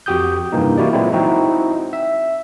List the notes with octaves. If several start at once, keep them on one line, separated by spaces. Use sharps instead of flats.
F2 F#4 G4 D#6 G6
G2 C3 E3 A#3 D#4
A#3 E4 F#4 G4 D5
A#2 E3 F#3 G#3 C4 E4
C4 D#4 E4 F#4
E5